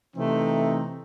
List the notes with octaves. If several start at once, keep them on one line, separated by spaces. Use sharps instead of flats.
C3 E3 A3 C4 D#4